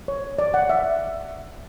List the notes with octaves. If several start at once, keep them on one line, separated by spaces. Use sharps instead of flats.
C#5
D5
F#5
E5